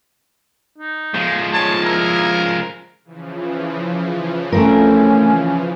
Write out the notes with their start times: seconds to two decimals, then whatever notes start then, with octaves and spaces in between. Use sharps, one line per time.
0.78 D#4
1.14 F3 G#3
1.53 C#5 A5
1.85 E4 A#4
3.05 C#3 E3 F3
4.52 A3 C4 C#4 A#4